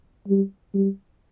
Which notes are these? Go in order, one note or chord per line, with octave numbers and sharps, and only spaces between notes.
G3
G3